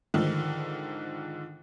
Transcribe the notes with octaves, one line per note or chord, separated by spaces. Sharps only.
G#2 D3 D#3 F3